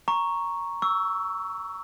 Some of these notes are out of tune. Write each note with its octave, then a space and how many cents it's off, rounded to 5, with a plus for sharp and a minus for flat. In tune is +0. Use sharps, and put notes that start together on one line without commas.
A#5 +0 C#6 +0
C#6 +30 E6 +0